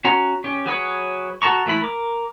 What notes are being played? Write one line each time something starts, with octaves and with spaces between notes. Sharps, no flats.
C#4 F#4 A#5
C#4 G4
F#3 G#4 B4 C#5
F#4 A4 A5 A#5 C#6
E3 A3 E4 B5
A#4 D6